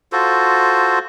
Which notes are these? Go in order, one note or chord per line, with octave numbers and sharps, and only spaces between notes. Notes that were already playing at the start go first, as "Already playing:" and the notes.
F4 F#4 A4 C5